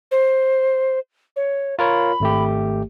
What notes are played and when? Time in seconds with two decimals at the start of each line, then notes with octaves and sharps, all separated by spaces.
0.11 C5
1.36 C#5
1.79 F4 A#4 C#5 B5
2.20 G#1 A3 G4